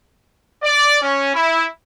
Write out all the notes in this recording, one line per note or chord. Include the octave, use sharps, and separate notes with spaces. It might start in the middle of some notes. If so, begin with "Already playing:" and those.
D5
C#4
E4